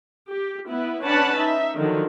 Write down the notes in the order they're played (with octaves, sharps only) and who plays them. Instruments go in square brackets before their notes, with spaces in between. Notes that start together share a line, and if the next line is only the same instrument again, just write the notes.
[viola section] G4
B3 E4 B4
C#4 D4 B4 F#5 A5 B5
D#4 E5
D3 D#3 F3 F#3